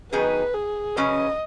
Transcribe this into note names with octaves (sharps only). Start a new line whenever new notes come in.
D#3 F#3 B3 D#4 G#4 B4
G#4
C#3 F#3 C#4 B4 D#5